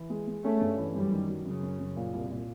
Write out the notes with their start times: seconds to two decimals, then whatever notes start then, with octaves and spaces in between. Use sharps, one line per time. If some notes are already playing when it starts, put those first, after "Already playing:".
Already playing: E3
0.10 G#3
0.27 G#3
0.44 A3 C#4
0.61 G2
0.78 E3
0.95 F#2 G3
1.12 D#3
1.29 F#3
1.46 F#2 C#3
1.63 F#2
1.79 F#2
1.96 A#2
2.13 C2
2.30 A#2